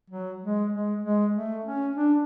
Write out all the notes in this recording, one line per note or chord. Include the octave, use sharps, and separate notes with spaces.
F#3
G#3
G#3
G#3
A3
C#4
D4